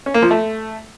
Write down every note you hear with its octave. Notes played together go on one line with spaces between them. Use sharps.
C#4
A#3
F3
A3